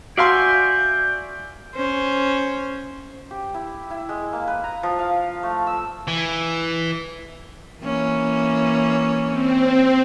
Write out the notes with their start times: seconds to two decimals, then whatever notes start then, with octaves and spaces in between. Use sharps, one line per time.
0.17 F#4 D5 E5 F5 G#5 C6 G6
1.75 C#4 C5
3.31 G4
3.54 E4
3.91 E4
4.09 G#3
4.33 A#3
4.47 B4
4.64 A#5
4.83 F3
4.99 F5
5.43 A3
5.67 E6
6.08 E3
7.81 E3 A#3 C#4
9.28 C4